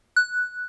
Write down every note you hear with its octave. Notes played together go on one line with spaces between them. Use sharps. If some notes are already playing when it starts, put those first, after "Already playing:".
F#6